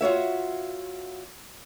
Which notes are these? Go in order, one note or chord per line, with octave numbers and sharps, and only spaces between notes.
F4 F#4 C#5 E5